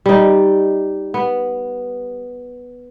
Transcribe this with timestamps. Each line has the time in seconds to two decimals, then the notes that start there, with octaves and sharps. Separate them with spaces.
0.06 G3 D#4
1.14 B3